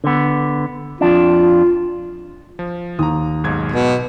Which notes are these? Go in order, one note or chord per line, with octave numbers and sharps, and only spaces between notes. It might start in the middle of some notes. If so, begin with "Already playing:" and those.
D3 B3
F2 D4 F4
F3
D#2 A#5 D#6
B1 G#2 G#6
B2